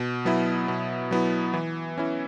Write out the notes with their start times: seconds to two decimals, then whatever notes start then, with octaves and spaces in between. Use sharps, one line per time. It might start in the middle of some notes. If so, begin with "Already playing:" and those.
Already playing: B2
0.25 F#3 B3 E4
0.68 B2
1.11 F#3 B3 E4
1.54 E3
1.98 C#4 E4